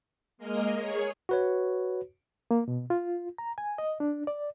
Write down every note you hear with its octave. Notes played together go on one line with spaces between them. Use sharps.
G#3 A#3 A#4 D#5
G#4 C#5
F#4 B4 C#5
A#3
B2
F4
A#5
G#5
D#5
D4
D5